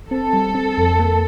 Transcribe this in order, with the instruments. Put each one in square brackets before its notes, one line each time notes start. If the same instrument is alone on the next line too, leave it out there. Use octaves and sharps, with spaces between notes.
[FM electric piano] C4 [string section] A4
[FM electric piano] G3
C4
F2
A#3